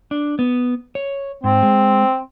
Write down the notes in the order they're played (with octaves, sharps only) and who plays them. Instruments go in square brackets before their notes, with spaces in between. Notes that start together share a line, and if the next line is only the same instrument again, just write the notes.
[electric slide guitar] D4
B3
C#5
[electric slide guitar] G#2 [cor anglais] C4
[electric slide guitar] G#3